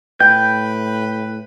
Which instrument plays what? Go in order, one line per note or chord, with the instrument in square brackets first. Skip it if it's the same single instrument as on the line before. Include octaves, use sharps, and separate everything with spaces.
[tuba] A2 [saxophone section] B4 [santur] G5 [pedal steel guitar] G6